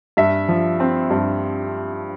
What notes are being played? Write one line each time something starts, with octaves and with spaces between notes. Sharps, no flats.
G2 E5
F3
C4
G2